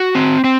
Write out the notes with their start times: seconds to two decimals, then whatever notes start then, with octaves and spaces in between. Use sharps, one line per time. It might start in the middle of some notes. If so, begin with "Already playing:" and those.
Already playing: F#4
0.15 C4
0.44 C4